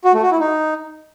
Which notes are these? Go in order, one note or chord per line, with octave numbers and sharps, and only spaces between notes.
F#4
A3
F#4
E4
D#4